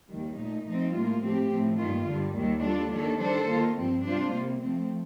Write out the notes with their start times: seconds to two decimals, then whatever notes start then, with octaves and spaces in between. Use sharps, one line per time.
0.10 D#2 D#3 G3
0.38 A#2 A3 D#4
0.66 F3 A3 C4 D#4
0.94 A2 G3 A#3 F4
1.22 A2 F3 A3 C4 G4
1.51 A2 F3 C4
1.79 G2 D#3 A#3 F4
2.08 G2 D3 G3
2.37 D#2 D#3 G3
2.65 G3 D4 F4 A4
2.92 D#2 D#3 A#3 D4 A4
3.22 D#3 G3 D4 A4 C5
3.50 D#3 A#3 F4
3.78 G2 F3 C4
4.07 C3 G3 D4 F4 C5
4.34 C3 G3 A#3
4.63 F3 A3 C4